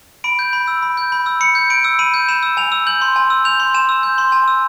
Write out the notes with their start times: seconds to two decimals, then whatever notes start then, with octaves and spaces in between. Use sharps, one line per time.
0.24 B5 D7
0.39 G6
0.53 B5
0.68 E6
0.82 B5
0.97 G6
1.12 B5
1.26 E6
1.41 B5 C#7
1.55 G6
1.70 B5 D7
1.84 E6
1.99 B5 D#7
2.14 G6
2.28 B5 E7
2.43 E6
2.57 G#5 F7
2.72 E6
2.87 G6 F#7
3.02 C6
3.16 G#5
3.30 E6
3.45 G6 F7
3.60 C6
3.74 G#5 E7
3.89 E6
4.03 G6
4.18 C6
4.32 G#5
4.48 E6